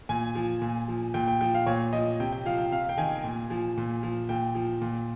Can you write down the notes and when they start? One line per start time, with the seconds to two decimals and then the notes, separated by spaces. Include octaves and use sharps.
0.09 A#2 G#5
0.35 F3
0.62 A#2
0.88 F3
1.14 A#2 G5
1.28 G5
1.41 F3 G5
1.54 F5
1.66 A#2 C#5
1.93 F3 D#5
2.20 C3 G5
2.32 G5
2.46 F3 F5
2.58 G5
2.71 C3 F5
2.89 G5
2.98 D#3 G#5
3.24 A#2
3.50 F3
3.77 A#2
4.03 F3
4.29 A#2 G5
4.55 F3
4.82 A#2